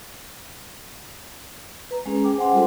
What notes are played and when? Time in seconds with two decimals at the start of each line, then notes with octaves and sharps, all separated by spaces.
1.91 B4 A#5
2.06 G#3 C#4 G#4
2.24 G#4 G5 D6
2.38 C5 F#5 G#5 C6
2.52 G3 F4 A4